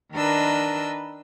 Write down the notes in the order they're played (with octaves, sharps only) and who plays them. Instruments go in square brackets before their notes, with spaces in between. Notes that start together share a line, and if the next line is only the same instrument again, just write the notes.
[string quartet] D#3 D4 A#4 B4 D#5 E6